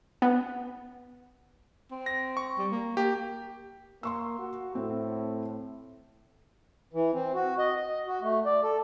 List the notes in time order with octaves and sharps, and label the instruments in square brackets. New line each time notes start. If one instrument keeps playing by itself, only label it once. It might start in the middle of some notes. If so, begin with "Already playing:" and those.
[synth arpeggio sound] B3
[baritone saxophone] C4
[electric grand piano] A#6
C#6
[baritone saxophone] G3
A#3
[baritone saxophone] A#3 [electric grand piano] G4
[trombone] A#3 [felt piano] C6 C#6 E6
[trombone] F#4
[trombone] A2 [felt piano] C4
[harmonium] E3
C4
F#4
D#5
D#5
F#4
A3
D5
A4